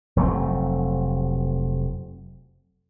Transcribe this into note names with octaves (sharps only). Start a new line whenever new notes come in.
F1 F#3 A3 C4